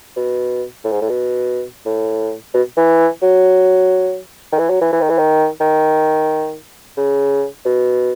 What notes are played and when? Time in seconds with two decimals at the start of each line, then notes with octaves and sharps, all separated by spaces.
0.16 B2
0.84 A2
0.92 G#2
1.02 A2
1.10 B2
1.86 A2
2.54 B2
2.77 E3
3.23 F#3
4.52 D#3
4.59 E3
4.70 F#3
4.81 E3
4.92 E3
5.01 D#3
5.09 E3
5.18 D#3
5.60 D#3
6.97 C#3
7.65 B2